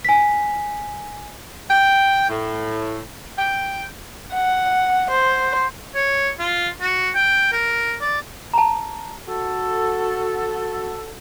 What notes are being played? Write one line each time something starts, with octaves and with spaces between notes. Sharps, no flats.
G#5 B6
G5
A2
G5
F#5
C5
C#5
F4
F#4
G5
A#4
D5
A5 A#5
F#4 A4